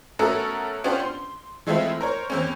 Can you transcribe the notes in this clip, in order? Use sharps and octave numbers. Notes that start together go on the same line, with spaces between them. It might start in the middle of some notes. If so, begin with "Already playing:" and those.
A3 B3 C#4 F#4 A4 A#4
B3 C#4 D4 F4 G4 C5
C6
E3 G#3 A3 C4 E4 F4
A#4 C5 C#5
E2 C4 C#4